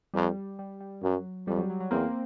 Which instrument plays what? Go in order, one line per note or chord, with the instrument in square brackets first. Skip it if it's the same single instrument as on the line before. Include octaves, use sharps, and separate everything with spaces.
[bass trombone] F2 [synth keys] G3
[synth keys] G3
G3
[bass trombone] F#2 [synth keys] F#3
[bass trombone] F2 [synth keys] G3
[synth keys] F#3
F#3
F#3
[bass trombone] E2 [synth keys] A#3 C4